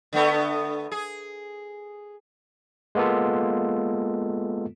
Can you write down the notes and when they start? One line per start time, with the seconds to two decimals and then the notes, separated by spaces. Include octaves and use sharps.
0.13 D3 A3 B3
0.92 G#4
2.95 G#3 A#3 B3 F4 A4